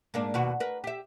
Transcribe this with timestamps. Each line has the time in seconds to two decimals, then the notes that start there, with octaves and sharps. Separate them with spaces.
0.14 G#2 A#3 D4
0.34 D#2 B2 F#4
0.60 A#4 B4
0.84 G4 E5